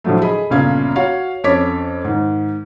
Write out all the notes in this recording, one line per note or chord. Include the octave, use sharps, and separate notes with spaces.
A2 D3 F3 F#3 A3
G#4 D#5 B5
G1 A#2 C#3 F5 G#6
F#4 C#5 F5
F2 C#4 A4 C#5 D6 B6
G#2 D#3